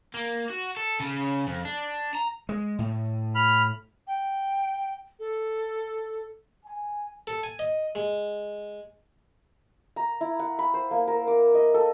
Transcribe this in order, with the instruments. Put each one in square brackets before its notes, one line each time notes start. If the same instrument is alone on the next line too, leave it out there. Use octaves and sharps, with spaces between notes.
[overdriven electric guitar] A#3
F#4
A4
C#3
F2
D4
A#5
[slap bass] G#3
A2
[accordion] B5 F6
[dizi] G5
A4
[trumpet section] G#5
[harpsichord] A4
G#5
D#5
G#3
[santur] A#5
E4
F#5
B5
C5
A#3
A#4
D6
D#5
A4